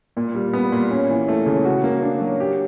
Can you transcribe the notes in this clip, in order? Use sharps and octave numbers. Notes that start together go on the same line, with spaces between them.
A#2
G3
B3
A#2
C#4
E3
A3
C#3
F#4
A#3
D4
F#3
G4